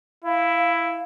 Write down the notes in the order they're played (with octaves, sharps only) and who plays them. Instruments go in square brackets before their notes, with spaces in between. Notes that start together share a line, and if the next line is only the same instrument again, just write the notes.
[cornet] E4 [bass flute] F5